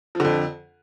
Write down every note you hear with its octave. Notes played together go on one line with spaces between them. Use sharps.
F2 D3 F3